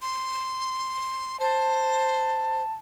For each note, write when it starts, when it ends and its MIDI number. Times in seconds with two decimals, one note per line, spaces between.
0.02 1.39 84
1.40 2.63 72
1.40 2.72 81